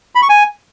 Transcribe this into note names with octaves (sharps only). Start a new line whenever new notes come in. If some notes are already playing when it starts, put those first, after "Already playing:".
B5
C#6
G#5